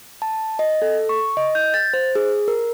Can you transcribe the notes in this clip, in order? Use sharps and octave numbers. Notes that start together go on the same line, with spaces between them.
A5
D#5
A4
C#6
D#5
G6
A6
C5
G#4
A#4